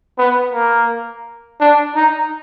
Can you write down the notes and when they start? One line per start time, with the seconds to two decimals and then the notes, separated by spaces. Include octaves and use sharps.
0.18 B3
0.53 A#3
1.60 D4
1.95 D#4